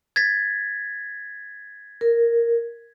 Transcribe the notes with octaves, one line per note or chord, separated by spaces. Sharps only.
G#6 A6 B6
A#4